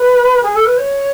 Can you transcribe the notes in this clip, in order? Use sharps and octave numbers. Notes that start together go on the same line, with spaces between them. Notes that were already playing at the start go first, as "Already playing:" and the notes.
Already playing: B4
G#4
A4
B4
C#5